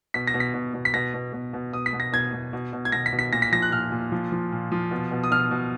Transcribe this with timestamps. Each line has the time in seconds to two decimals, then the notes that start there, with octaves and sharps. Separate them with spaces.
0.14 B2 B6
0.27 A#6
0.34 B2
0.40 B6
0.54 B2
0.74 B2
0.85 B6
0.94 B2 A#6
1.14 B2
1.33 B2
1.54 B2
1.73 B2 D#6
1.86 B6
1.93 B2
2.00 A#6
2.13 B2 G#6
2.33 B2
2.53 B2
2.73 B2
2.85 G#6
2.92 B2 A#6
3.06 B6
3.12 B2
3.19 B6
3.32 A#2 A#6
3.42 B6
3.52 F3 A#6
3.62 F#6
3.72 A#2 F6
3.92 A#2
4.12 F3
4.32 F3
4.52 A#2
4.72 F3
4.91 B2
5.12 B2
5.24 D#6
5.31 B2 F6
5.51 B2